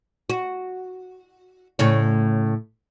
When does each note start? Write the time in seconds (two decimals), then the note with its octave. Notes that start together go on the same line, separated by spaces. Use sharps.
0.30 F#4
1.79 A2 C#3 C#5